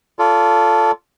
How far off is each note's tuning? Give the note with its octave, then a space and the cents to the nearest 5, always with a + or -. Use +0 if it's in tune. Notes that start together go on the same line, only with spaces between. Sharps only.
F4 -5 A4 +0 D5 -40